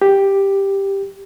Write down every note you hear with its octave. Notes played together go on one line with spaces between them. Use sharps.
G4